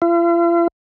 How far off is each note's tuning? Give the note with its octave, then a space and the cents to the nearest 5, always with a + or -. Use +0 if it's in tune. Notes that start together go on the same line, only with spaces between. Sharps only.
F4 -45